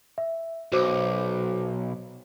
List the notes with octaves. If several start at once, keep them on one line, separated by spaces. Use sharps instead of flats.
E5
B1 F#4 C5 D6